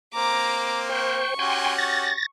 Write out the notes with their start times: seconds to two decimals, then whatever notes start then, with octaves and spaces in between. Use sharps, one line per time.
0.14 A#3 C4 A#5 D6
0.89 C5 G5 C#6
1.39 C#4 F#4 G4 G5 G#5 C6
1.78 A6 A#6